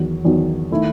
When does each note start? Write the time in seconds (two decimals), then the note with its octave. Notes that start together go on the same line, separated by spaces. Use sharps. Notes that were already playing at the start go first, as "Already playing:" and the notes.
Already playing: E2 D#3 F#3
0.25 E2 D#3 F#3
0.72 D#3 A3 E4